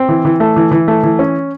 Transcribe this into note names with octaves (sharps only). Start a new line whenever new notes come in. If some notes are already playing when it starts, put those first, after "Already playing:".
Already playing: C4
E3
E3
A3
E3
E3
A3
E3
C#4